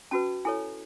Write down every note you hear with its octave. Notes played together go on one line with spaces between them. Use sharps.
C#4 F#4 B4 A5
E4 A4 C#5 G#5